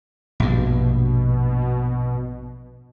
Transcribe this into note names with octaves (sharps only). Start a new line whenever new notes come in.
A#1 G2 B2